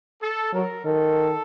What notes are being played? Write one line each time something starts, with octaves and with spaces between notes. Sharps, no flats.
A4
F#3 A#4
D#3 A4